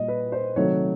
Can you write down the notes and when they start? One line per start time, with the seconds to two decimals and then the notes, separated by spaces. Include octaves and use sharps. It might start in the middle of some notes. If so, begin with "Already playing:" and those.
Already playing: A#2 G3 D#5
0.08 B4
0.32 C5
0.56 C3 D#3 F#3 A3 C#5